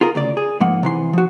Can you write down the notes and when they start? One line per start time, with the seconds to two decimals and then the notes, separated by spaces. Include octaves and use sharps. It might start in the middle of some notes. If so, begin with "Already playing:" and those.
0.01 F4 G#4 A#4
0.15 D2 C#3 D5
0.37 G#4
0.60 G#2 F3 A#3 F#5
0.83 C3 E3 C6
1.13 F3 F#4